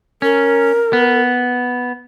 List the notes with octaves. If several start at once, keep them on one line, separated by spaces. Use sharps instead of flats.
C#4 A#4
B3